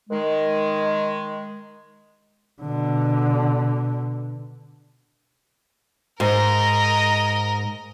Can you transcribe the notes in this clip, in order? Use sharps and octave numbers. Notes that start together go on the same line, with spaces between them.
D#3 G#3
B2 D3
G#2 A#4 D#5